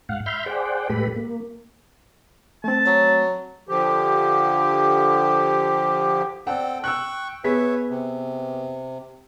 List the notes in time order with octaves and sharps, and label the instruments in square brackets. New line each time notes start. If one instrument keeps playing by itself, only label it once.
[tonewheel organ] G#2 F5 F#5
E5 B5 C6 F6 G6
G#4 C5 D5 F#5 G5
A2 G#3 G4 A4 B4 B5
A#3
[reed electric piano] A3 C4 [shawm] A5
[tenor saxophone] F#3
[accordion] D3 F3 G4
[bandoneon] C4 A4 G5 [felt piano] D5 F#5
[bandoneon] G5 C#6 [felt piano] E6 F#6
[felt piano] B3 G#4 B6 [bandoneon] B4 C#5 E5
[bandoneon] C3